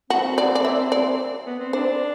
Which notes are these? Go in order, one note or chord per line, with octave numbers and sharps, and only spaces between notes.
C4 F#4
D5
D5
E5
D5
B3
C4
D4 C5